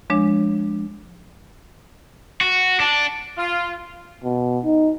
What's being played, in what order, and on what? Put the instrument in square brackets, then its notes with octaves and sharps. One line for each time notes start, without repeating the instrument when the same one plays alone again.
[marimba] F3 G#3 D4 C#5
[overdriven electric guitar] F#4
D4
[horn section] F4
[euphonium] B2
D#4